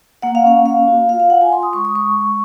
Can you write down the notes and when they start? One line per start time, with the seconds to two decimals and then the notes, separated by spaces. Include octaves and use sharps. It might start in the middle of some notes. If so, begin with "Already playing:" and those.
0.22 A#3 F#5
0.35 F5
0.44 C#4 F#5
0.66 A#3 F5
0.88 F#4
1.09 F4 F5
1.20 F5
1.30 F4 F#5
1.41 G#5
1.52 F4 C6
1.63 D#6
1.73 G#3 C#6
1.85 D#6
1.95 G#3 C#6
2.16 G#3